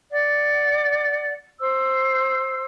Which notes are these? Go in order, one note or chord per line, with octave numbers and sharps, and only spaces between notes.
D5 F#5
C5 E6